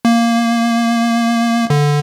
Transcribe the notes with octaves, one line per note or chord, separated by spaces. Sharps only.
A#3
D3